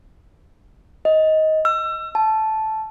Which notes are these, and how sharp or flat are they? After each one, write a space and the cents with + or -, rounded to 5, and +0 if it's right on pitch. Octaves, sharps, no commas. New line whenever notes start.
D#5 +15
E6 +30
A5 -10